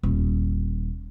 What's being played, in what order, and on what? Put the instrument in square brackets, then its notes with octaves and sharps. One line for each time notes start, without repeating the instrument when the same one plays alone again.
[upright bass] D#1